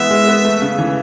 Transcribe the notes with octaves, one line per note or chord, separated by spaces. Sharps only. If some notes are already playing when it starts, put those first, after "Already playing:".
Already playing: E3 G#3 B3 E5
G#3
B3
A3
C#3
E3